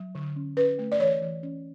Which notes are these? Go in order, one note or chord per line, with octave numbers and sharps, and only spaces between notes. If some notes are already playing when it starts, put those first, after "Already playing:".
Already playing: F#3
D3
C#4
C#4 B4
A3
D5
E3 C#5
E3
C#4